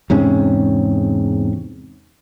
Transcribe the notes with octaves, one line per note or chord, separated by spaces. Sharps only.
E2 G#2 C3 C#4